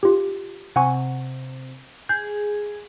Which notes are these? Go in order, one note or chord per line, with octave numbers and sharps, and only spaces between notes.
F4 G4
C3 F#5 G#5 C#6
G#4 G6